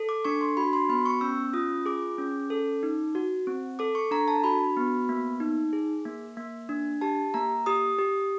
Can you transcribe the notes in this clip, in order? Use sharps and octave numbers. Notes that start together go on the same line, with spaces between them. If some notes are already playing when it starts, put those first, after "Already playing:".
Already playing: A4
D6
D4 C#6
C6
F#4 B5
C6
B3 B5
C#6
C#4 E6
F4 D#6
G#4 D6
C#4
A4
D#4
F#4
C4
A4 D6
C#6
D4 A#5
A5
F#4 B5
B3
A#3
D#4
G#4
A#3
A#3
D4
G4 A5
A#3 A#5
G4 D#6
G4